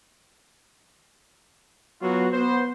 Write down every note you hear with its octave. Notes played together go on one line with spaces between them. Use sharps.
F#3 B3 F4 F#4
B3 C5